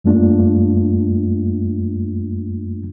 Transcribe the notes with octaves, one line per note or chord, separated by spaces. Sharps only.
F#2 G3 A3 A#3 D4 F4